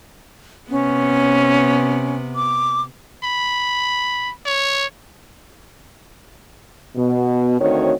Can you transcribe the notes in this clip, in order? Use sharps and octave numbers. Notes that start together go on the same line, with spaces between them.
C3 B3 C#4
D6
B5
C#5
B2
D2 D#3 C4 F#4 C#5